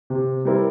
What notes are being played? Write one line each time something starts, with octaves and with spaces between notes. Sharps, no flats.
C3
G3 C4 E4 A#4